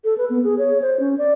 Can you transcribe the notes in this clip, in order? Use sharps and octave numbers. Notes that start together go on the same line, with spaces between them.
A4
B4
B3
G#4
C#5
C5
C#4
D5